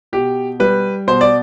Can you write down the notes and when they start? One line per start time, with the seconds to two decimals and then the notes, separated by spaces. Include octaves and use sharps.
0.13 B2 G4
0.60 G3 B4
1.07 B2 C5
1.21 D5